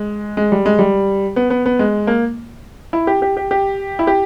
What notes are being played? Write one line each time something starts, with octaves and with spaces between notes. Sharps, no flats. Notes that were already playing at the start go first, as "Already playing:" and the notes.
Already playing: G#3
G#3
G3
G#3
G3
B3
B3
B3
G#3
A#3
E4
G4
G4
G4
G4
E4
G4